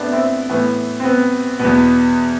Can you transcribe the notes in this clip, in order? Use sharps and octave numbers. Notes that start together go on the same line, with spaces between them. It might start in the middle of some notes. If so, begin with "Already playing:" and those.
Already playing: A2 A3 B3 C4 D4
C4 E4
A2 E3 B3
C4
B3
B2 B3
E2